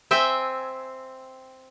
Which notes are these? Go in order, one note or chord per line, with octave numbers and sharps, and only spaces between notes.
C4 E5 G5 G#5